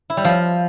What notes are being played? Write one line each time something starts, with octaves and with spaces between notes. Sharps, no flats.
E4
G3
F3